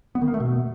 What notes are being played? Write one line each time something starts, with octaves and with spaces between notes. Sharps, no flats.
B3
D#3
A#3
A3
B2